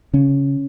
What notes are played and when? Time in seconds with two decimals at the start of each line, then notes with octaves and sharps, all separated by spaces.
0.13 C#3 C#4